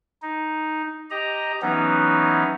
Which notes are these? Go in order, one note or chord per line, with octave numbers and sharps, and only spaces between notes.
D#4
G4 D#5 A#5
E3 F#3 B3 C#4 D#4